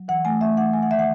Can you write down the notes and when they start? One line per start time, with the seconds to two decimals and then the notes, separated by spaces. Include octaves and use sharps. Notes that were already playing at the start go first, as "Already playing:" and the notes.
Already playing: F#3
0.08 E3 F#5
0.25 A3 G#5
0.41 A3 E5
0.57 E3 F#5
0.73 A3 G#5
0.83 F#5
0.90 D#3 E5
0.99 F#5